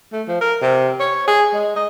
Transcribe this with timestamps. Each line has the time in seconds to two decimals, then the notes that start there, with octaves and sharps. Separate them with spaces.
0.12 A3
0.28 F3
0.41 A#4
0.61 C3
1.00 C#5
1.27 G#4
1.53 G#3
1.76 D#5